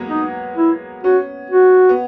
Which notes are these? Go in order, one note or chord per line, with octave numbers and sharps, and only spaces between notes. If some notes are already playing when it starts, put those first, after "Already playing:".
Already playing: F#3 G#3 A#3 B3
D#4
E4
C#4 F#4
F#4
B3